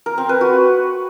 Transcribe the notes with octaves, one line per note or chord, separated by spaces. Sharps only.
A#4
C4
B4
F#4